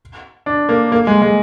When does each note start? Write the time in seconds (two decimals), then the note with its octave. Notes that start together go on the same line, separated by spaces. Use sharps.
0.46 D4
0.69 A#3
0.92 A#3
1.07 G#3
1.22 G#3